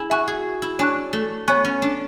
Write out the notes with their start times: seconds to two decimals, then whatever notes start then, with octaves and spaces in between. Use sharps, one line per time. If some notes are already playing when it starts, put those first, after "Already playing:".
Already playing: E4 G#4
0.10 F#4 E5 G#5 C#6 F#6
0.28 G#4
0.62 E4
0.79 D4 C#5 G#5 C#6 F#6
1.13 A3
1.48 B3 C#5 G#5 C#6 F#6
1.65 C#4
1.82 D4